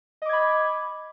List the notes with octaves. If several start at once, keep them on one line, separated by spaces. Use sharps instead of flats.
D#5 B5 D6 G#6